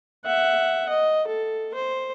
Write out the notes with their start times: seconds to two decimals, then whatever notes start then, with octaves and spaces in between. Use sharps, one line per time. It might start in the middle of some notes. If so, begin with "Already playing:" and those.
0.25 E5 F#5
0.89 D#5
1.27 A4
1.74 C5